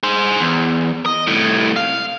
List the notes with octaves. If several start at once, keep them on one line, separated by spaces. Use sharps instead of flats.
G#4 C5
E2
D#5
C2 A2
F5